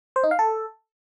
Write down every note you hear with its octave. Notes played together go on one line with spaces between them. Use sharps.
C5
D#4
F5
A4